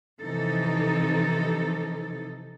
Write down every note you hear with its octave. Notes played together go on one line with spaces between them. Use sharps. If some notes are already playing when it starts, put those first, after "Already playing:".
C3 E3 F3 D#4 A4